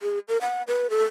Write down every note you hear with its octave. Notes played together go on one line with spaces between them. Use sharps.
G#4
A#4
F#5
B4
A4